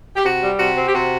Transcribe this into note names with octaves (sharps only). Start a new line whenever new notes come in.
G4
C3 F#4
G3
C3 F#4
C4
G4
C3 F#4